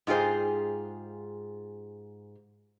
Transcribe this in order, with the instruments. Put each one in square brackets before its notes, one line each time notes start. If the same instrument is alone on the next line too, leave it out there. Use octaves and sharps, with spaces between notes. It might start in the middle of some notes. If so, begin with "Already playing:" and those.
[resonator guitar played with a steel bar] G#2 F4 G4 G#4 C5